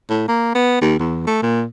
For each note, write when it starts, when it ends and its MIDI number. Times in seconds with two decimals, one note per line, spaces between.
0.10 0.24 45
0.28 0.52 58
0.55 0.77 59
0.81 0.96 39
0.99 1.24 40
1.27 1.41 57
1.42 1.64 46